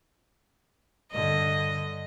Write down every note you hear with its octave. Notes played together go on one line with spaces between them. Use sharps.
G2 D3 D#5